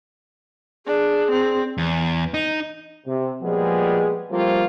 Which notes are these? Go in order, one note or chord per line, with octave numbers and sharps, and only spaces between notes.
D4 G#4
C4
E2
D#4
C3
A#2 F3 G3 G#3 B3 G#4
F3 G3 A3 A#3 C4 F4